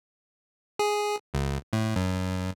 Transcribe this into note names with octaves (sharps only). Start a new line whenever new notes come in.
G#4
C#2
A2
F#2